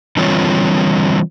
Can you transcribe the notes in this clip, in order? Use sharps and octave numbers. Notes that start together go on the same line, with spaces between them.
D3 E3 G3 C4 F4 C#5